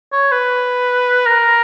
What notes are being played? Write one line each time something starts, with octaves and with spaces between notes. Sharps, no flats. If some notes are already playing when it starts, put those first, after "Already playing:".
C#5
B4
A#4